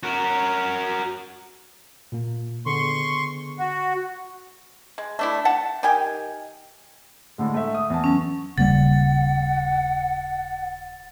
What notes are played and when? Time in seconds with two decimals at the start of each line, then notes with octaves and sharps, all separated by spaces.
0.03 F#4 A#4
2.12 A#2 A#3
2.66 D3 B3 G#4 C6 C#6
3.59 F#4
4.98 G#3
5.19 A3 D4 E4
5.45 F#5 A5
5.83 D#3 G4 G5 G#5
7.38 A2 D3 G#3
7.54 A3 E5
7.75 D#6
7.90 E2 A5
8.04 F#3 C#4
8.58 D#1 C#3 G3 A#3 F#5 A6